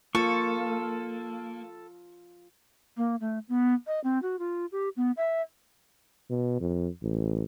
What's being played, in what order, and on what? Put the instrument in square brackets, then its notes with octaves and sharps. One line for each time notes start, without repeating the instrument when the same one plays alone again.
[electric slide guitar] A#3 [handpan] F4 [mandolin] A4 [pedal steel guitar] C#6
[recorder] A#3
A3
B3
D#5
C4
F#4
F4
G4
B3
E5
[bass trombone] B2
F2
A1